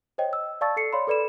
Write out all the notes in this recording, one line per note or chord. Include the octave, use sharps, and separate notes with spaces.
C5 C#5 D#5 G5
E6
D5 F5 A5 C#6 E6 A6
A4 C7 C#7
C#5 D5 F5 B5 C6
A4 B4 D5 B5 E7